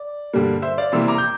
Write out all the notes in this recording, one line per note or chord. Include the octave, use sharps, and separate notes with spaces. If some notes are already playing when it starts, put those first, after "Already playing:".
Already playing: D5
G2 D3 G3 A#3
C5 E5
D5 F5
C3 E3 G3 A#3 C6 E6
A#5 D6
G6